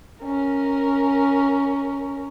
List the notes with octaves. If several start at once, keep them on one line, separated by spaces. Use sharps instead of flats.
C#4 A#4